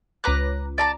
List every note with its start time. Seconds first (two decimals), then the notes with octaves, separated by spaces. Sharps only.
0.24 C#2 B4 A#5 D6 F#6
0.78 D5 A5 A#5